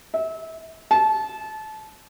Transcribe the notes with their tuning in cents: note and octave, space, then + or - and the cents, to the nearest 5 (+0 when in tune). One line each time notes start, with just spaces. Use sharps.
E5 -30
A5 -25